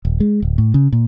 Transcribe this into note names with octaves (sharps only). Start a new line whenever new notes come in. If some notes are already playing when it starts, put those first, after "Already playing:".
D#1
G#3
D1
A2
C#3
A#2